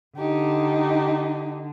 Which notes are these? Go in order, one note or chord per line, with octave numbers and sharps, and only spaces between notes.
D3 D#4 G4